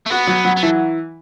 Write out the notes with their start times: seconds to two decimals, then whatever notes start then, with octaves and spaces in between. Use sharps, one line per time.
0.06 A3
0.10 B3 F#4
0.27 F#3
0.45 F#3
0.56 B3
0.63 E3 A3